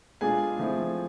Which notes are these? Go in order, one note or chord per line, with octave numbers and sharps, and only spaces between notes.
B2 G#3 D4 F4 G#4 G#5
F3 A3 C4 E4